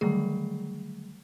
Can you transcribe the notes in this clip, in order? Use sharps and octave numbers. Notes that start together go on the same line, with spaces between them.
D3 D#3 F#3 G3 A3 G#4